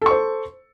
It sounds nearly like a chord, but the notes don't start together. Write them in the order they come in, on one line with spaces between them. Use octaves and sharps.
A4 C#6 C5